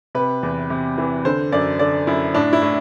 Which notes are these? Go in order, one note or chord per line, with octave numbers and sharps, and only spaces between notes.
C3 B4
E2
C3
E3
D3 C5
F#2 D5
D3 D5
F#2 E4
A2 D4
E4
A2